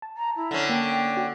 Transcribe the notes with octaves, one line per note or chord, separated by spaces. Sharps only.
A5
A#5
E4
D3 C#4
A#3 G5
F#4